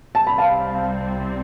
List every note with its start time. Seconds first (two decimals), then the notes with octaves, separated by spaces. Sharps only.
0.15 C2 C3 G3 C4 A5
0.27 B5
0.38 F5 A5